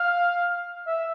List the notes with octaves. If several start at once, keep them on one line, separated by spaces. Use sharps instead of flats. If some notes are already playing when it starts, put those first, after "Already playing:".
Already playing: F5
E5